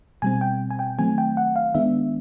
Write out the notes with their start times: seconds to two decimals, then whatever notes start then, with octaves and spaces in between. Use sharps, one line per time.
0.22 B2 G3 C4 G#5
0.41 G5
0.71 G#5
0.79 G5
0.98 D#3 F#3 A3 C4 G#5
1.18 G5
1.37 F#5
1.56 F5
1.75 D#3 G#3 B3 D4 E5